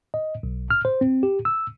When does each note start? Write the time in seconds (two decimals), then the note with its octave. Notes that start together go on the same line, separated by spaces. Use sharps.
0.14 D#5
0.43 B1
0.70 F6
0.85 C5
1.01 C4
1.23 G4
1.45 E6